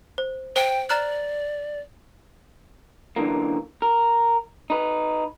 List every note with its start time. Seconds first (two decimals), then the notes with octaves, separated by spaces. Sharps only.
0.18 C5
0.56 C5 G5
0.90 D5 A#5 F6 F#6
3.16 F#2 D3 E3 A#3
3.82 A#4
4.70 D#4 B4